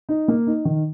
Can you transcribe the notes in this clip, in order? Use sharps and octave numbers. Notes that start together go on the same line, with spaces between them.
D#4
A#3
D#4
D#3